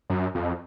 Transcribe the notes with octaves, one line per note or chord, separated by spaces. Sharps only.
F#2
F2